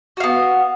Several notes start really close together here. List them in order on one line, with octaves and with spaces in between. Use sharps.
F#4 F5 B3